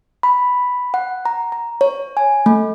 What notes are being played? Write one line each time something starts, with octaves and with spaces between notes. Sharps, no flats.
B5
F#5
A#5
A#5
C#5
G#5
A3